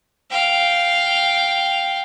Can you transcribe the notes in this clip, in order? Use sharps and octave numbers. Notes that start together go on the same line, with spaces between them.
F5 G5